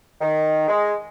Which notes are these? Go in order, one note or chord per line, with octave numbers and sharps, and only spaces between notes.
D#3
G#3